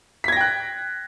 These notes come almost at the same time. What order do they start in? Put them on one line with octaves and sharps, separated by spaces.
B6 G#6 A#6 G5 F#6